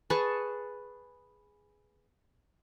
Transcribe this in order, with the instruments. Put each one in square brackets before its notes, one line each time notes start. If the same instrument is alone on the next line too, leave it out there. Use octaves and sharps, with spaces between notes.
[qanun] G#4 B4 A5 C#6